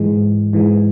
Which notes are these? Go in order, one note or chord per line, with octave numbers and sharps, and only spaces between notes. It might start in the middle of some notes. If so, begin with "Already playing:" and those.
Already playing: G#2 E3 G#3
G#2 E3 G#3